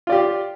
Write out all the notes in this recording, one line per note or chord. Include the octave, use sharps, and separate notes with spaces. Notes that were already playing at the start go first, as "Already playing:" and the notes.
F4 G4 D5